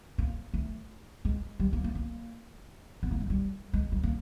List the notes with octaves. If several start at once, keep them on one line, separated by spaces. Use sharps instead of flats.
A#3
A3
G#3
G3
A#3
A#3
A#3
B3
A#3
G#3
G3
G#3
G3
A#3